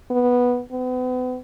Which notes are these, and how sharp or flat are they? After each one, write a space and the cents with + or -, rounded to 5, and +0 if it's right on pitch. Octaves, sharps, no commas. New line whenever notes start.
B3 -5
B3 +40